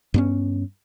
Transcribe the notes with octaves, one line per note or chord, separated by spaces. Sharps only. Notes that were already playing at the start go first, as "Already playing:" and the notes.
G2 B3 C#4